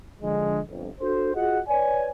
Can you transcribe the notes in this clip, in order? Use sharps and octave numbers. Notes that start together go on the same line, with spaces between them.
D3 F3 G#3
G1 F2
D4 F#4 A4 C5
F4 F#4 G#4 D#5 F#5
B4 C#5 D5 G#5